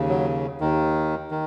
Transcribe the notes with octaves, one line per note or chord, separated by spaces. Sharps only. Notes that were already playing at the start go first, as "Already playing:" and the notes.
Already playing: D#2 C#3
F#3
D#2 D#3
D#3